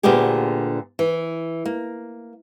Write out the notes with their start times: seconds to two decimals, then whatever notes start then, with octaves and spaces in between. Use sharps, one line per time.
0.03 D2 A#2 D3 B3 G4 G#4
0.99 E3
1.66 A#3